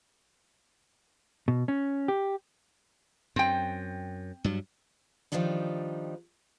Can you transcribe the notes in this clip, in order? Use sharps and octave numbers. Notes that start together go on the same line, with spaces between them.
B2
C#4
G4
F#2 C4 G5
G2 F#3
D#3 F3 G3 D4 D#4